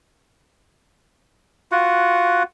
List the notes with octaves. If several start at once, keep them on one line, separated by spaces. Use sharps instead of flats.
F4 F#4 F#5